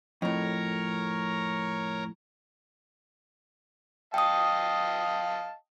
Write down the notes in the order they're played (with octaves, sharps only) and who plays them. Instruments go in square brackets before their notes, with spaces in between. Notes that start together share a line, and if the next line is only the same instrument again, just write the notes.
[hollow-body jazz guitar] F2 A2 [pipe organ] A#4 C#5 A#5
[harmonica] D#5 F5 A5 [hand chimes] G5 D#6